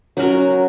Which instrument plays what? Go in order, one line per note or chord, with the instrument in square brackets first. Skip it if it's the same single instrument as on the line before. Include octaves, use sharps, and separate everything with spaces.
[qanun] F#3 D#4 F#4 A#4 [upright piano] C#4